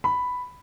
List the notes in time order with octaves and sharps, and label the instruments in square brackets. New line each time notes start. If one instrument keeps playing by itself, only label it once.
[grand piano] B5